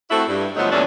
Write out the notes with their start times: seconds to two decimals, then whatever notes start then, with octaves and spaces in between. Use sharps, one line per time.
0.10 A3 C4 E4 F#4
0.28 G2
0.56 D3 F3 F#3 A3 B3 D#4
0.70 E2 A#2 A3 C#4 D4